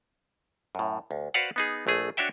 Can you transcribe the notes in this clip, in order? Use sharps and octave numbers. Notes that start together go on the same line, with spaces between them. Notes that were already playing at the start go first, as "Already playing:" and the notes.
F#2 A2
D2
F#4 B4 C5 D5 F5 F#5
B3 D#4 G#4
A#1 A3 G#4
D4 F#4 C#5 E5 G5